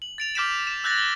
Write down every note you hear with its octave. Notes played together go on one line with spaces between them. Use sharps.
F#7
A6 D7 F7
D6 F6 G6 B6 D7 E7
E7
E6 F#6 G6 A6 A#6
G7